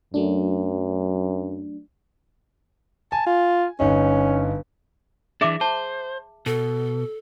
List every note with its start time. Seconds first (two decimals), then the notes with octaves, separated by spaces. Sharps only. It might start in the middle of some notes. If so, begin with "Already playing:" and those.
0.14 F#2 F#3 A3 D4
3.12 G#5 A5
3.26 F4
3.80 G1 C#4 D#4
5.41 E3 D4 G#4 E5 D6
5.61 C5 A5
6.46 B2 A4